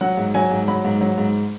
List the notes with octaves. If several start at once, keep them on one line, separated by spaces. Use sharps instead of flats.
F#3 F#5
G#2
F#3 G#5
G#2
F#3 B5
G#2
F#3
G#2